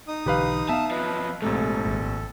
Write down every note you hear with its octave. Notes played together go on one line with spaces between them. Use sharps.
D#4 D#6
B1 D3 E3 G4 B4 F5
B3 E5 F5 A5
F#2 F3 B4 D#5
A#1 G#2 C3 A3 A4
G#1